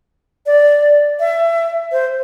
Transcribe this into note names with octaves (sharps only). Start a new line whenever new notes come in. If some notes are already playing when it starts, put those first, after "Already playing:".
D5
E5
C5